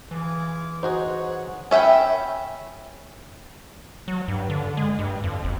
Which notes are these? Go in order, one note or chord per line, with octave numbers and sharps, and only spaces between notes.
E3 F4 G#4 D6
D#4 F#4 G#4 C5 C#5 F#5
C#4 E5 F#5 G5 B5
F#3
G2
D3
G#3
G2
F2
F#1